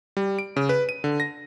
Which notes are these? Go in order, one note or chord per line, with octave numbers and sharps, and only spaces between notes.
G3
D7
C#3
B4
D#7
D3
A#6